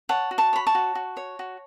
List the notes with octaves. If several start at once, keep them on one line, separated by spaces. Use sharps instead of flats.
C#5 F#5 A5
F#4
A5 C#6
C#5 B5
A5 C#6
F#4
F#4
C#5
F#4